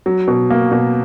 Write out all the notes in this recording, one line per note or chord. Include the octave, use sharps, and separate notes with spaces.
F#3
B2
A#3
B2